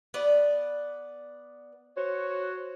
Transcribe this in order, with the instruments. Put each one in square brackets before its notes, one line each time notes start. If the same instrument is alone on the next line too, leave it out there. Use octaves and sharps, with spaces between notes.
[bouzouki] B3 D5
[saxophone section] F#4 C5 C#5